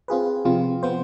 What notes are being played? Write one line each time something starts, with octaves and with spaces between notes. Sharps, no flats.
C4 F4 G#4 B4
C3 F3 C4 F4
F3 B3 F4 C5